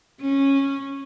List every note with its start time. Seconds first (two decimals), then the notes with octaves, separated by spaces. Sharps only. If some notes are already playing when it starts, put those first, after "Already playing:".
0.21 C#4